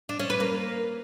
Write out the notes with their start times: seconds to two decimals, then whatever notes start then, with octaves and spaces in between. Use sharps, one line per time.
0.09 D4
0.19 C#4
0.30 B4
0.40 A#3